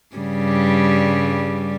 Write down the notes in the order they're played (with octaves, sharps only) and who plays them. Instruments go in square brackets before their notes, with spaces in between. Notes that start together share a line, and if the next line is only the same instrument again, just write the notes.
[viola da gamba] G2 C#3 G3